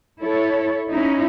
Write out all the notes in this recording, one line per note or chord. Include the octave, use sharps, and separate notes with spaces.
E4 A4 C#5
C#4 D#4 E4